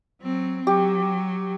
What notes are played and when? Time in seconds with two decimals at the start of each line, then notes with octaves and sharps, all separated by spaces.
0.22 F#3 C4
0.67 F#3 G4